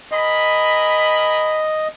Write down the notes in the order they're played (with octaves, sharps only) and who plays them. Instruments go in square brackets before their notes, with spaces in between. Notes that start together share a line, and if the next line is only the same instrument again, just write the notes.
[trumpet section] A#4 G#5 B5 [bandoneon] D#5